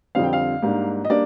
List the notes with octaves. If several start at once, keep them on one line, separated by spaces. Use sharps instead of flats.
F2 D3 G3 C4 F5
G5
F5
G#2 G3 A#3 D4
D#5
G3 A#3 D4 D5